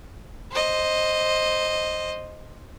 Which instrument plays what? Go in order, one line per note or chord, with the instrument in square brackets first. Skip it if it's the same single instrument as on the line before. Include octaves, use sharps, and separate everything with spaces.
[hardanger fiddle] C5 D#5